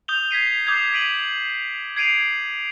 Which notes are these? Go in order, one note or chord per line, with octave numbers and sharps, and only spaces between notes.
D#6 G6 F7 G7
G#6 B6 C7 D#7
D6 D#6 G6 G#6 C7
B6 D7 D#7 F#7
G#6 C7 D7 D#7 F7